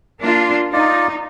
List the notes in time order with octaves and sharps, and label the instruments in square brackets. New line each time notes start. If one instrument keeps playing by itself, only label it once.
[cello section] A#3 D4 F4
[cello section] D#4 [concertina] F4 D5